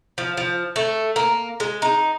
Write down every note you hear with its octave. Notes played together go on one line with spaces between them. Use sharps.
F3
F3
A3
A#3
G#3
D#4